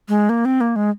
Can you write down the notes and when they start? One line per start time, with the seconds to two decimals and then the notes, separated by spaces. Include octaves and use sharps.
0.09 G#3
0.29 A#3
0.45 C4
0.61 A#3
0.76 G#3